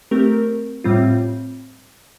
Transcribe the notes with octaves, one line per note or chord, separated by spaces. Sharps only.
A3 C4 G4 A#4
A2 G3 C4 F4